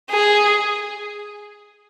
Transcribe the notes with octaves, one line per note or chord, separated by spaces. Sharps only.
G#4